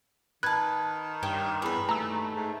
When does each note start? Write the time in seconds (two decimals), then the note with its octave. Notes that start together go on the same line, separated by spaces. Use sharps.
0.43 D#3 B4 A5 F#6 G#6
1.23 G2 G4 C#5
1.62 E2 G#4 B4
1.89 D#2 A3 A#5 E6
2.35 G#2